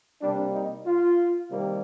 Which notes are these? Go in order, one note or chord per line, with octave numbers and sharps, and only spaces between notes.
C3 G3 A#3 D4
D#4
F4
C3 D#3 G3 A#3